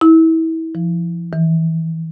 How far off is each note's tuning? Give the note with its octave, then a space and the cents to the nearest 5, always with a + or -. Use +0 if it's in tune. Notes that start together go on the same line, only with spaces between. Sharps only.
E4 -30
F3 -35
E3 -25